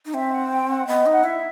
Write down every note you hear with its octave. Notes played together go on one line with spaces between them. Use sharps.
D#4
C4 E5
F#5
G5
F#5
B3 D#5
D#4
F#5
E4 E5